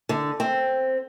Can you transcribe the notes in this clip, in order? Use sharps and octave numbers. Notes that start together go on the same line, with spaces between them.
D3
C4